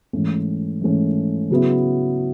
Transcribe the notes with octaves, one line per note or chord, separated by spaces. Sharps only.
G#2 E3 A3 C#4
G#2 E3 A3 C#4
C#3 F#3 B3 E4